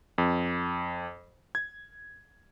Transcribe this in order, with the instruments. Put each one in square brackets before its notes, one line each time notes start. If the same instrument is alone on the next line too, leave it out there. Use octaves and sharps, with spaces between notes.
[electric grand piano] F2
G#6